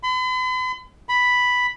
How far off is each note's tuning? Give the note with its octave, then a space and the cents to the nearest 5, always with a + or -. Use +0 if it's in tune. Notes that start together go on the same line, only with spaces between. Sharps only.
B5 +45
B5 +0